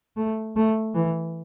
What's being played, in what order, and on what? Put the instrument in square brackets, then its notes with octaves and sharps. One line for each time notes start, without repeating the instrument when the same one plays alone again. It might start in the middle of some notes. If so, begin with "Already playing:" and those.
[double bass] A3
A3
E3